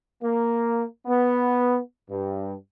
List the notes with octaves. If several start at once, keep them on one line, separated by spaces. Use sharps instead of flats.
A#3
B3
G2